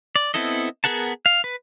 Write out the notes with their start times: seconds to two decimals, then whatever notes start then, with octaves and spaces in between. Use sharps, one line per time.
0.16 D5
0.34 B3 C4 E4 A4 D#5
0.84 B3 G#4 A#4 F#5 A5
1.26 F5
1.44 B4